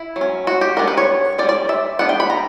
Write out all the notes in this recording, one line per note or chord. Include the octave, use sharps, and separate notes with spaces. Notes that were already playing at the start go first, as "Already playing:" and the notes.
Already playing: E4
F#3
C#4
F#4
G4
G3 B3 D4 A#4
B4
C#5
G3 C#4 D5
D5
E5
G3 B3 D4 F#5
G5
B5
A#5